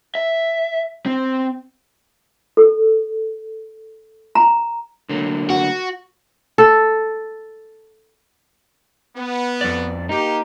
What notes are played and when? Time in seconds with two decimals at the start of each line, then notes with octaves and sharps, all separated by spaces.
0.15 E5
1.06 C4
2.57 A4
4.35 A#5
5.09 D3 F#3 A#3
5.50 F#4
6.58 A4
9.16 B3
9.61 F2 D5
10.09 A#3 D#4 G4